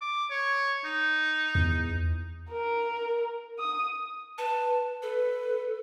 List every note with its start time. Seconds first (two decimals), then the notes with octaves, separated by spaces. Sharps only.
0.01 D6
0.31 C#5
0.85 D#4
1.55 E2
2.51 A#4
3.59 D#6
4.38 B4 A5
5.02 A4 B4